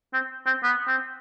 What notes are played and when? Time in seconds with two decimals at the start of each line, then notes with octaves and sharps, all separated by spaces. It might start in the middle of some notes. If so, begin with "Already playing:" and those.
0.14 C4
0.46 C4
0.63 B3
0.88 C4